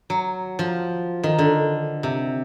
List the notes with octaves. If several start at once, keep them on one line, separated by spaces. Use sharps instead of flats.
F#3
F3
D#3
D3
C3